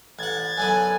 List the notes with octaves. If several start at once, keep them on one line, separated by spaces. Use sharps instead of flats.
A1 F#5 G#6 A6
F#2 D3 B3 G#5